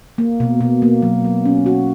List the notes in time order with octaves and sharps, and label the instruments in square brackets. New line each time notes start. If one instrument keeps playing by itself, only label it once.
[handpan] A#3
B2
B2
A#3
F#3
F#3
C#4
F#4